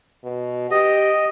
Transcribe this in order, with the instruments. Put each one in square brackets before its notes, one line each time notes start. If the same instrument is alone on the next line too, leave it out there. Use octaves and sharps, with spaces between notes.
[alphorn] B2
[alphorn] G4 [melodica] D#5